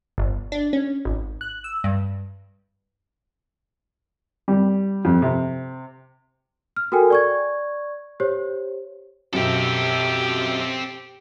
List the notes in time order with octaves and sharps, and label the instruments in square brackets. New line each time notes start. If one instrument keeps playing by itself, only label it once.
[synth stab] G1
D4
C#4
G#1
F#6
E6
G2
[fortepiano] G3
F2
C3
[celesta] F6
F#4 A4 A#4 G5 G#5
D5 C#6 G#6
G4 C5 C#5
[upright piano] B1 F#2 [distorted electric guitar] C4 A4 [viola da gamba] G4